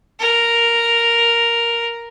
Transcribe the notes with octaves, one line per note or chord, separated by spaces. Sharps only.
A#4